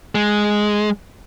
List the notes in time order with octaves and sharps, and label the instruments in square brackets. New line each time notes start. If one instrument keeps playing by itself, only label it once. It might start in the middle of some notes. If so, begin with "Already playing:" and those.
[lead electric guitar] G#3